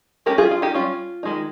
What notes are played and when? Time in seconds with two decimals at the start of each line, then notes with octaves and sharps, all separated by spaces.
0.26 G#3 C#4 G4 A#4
0.38 F4 G#4
0.51 F4
0.62 D#4 G4
0.74 G3 C#4 F4
1.23 D#3 G#3 D#4